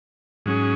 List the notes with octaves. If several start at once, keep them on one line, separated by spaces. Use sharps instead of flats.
G#2 F#3 C#4 G#4